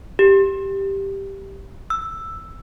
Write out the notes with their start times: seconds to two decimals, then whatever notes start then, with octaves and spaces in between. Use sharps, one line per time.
0.19 G4
1.90 E6